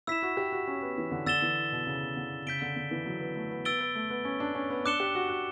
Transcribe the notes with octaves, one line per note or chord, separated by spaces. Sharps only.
E4 E6 B6 E7
F#4
G4
F#4
C#4
B3
E3
D3
D3 E6 A6 E7 G7
E3
B2
C#3
D3
C#3 G6 B6 D7 G7
D3
D3
E3
F#3
B3
A3
B3
B3 E6 A6 D7 G7
B3
A3
B3
C#4
D4
C#4
B3
D4 D6 F#6 C#7 E7 G7
G4
F#4
F#4